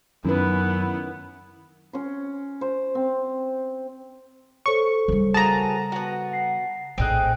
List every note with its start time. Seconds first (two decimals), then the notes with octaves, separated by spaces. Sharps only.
0.25 F#2 D#3 B3 C#4 E4 B4
1.93 C#4 C6
2.61 C5
2.95 C4
4.66 A4 C5 C#5 C#6
5.08 C#3 G3
5.34 A#3 F#4 G#4 A5 A#5
5.92 B3 F#4
6.31 F#5 C7
6.98 A#1 A2 C4 D#4 G#4 F#6 D7